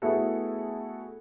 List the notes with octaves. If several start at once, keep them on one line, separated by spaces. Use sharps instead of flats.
A3 B3 E4 F#4 G#4 A4